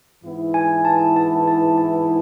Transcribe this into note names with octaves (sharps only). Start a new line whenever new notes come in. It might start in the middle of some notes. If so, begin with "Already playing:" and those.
G#2 E3 B3 E4
G#5
A5
A5
A5
A5